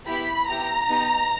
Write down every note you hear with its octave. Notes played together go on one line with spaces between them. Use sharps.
B3 E4 G4 B5
B3 E4 G4 A#5
B3 D#4 G4